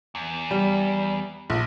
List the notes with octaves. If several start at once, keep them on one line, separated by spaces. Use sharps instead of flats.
E2
G3
A#1